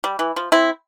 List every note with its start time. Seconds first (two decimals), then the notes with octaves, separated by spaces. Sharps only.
0.04 G3
0.19 E3
0.36 F3
0.52 C4 E4